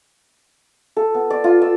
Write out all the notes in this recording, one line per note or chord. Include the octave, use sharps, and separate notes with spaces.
A4
B3
D5
F4
E6